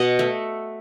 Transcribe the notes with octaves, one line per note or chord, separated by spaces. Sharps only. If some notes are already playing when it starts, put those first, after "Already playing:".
Already playing: B2 D#5 F#5
A3